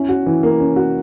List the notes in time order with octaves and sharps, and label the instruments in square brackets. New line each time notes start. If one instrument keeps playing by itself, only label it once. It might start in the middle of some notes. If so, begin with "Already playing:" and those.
Already playing: [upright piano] C#4 E4
F#4
E3
A#3
C#4
F#4